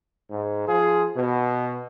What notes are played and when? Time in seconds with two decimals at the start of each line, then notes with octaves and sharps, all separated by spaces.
0.30 G#2
0.67 F3 F4 G#4
1.16 B2